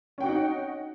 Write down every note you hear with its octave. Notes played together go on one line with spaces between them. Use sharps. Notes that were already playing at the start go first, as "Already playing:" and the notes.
C#4 D#4 F#4 F#5 G5